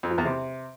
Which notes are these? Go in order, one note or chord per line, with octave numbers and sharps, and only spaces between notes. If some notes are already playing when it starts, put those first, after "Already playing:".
F2
F3
E2
C3